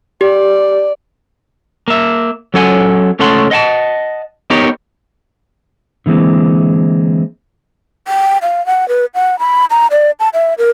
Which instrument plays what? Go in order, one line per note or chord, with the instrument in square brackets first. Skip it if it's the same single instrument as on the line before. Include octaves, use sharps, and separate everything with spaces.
[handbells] G4 [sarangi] D5
[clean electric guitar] A#3 E5
F#3 C#4 A4 C#5 F#5 G#5
C#2 A3 C#4 A4 F#5 C6
D#5 F#5 G#5 A5
B3 D#4 G4 A#4 B4 C#5
[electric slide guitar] D3 E3 G#3 A#3 C4
[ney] G5
F5
F#5
B4
F#5
B5
A#5
D5
A5
E5
A#4